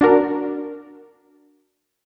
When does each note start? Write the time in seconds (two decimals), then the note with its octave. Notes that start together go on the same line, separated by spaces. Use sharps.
0.01 D4 F#4 A#4